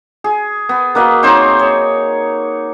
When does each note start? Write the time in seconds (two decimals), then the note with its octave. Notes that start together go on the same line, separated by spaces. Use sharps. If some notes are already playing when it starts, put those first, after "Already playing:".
0.24 G#4
0.69 B3
0.95 A#3 F#4 B4 D#5
1.23 C4 D#4 C5 C#5
1.59 C#5